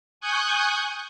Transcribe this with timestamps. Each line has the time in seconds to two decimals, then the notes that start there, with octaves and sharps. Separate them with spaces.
0.21 G#5 C#6 D#6 F#6 G6